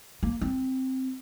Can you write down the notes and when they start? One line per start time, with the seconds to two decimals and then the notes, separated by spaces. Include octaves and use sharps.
0.23 A#3
0.41 C4